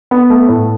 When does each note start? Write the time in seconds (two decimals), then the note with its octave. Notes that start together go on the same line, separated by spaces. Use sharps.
0.11 B3
0.30 A3
0.48 A2